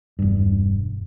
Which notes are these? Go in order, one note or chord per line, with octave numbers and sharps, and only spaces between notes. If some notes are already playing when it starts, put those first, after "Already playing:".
E1 G2